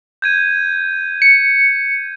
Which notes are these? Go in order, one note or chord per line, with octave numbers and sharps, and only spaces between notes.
G6 G#6 D#7
C#7